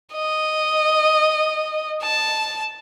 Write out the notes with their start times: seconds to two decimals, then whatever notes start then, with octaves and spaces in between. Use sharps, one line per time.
0.14 D#5
2.02 A5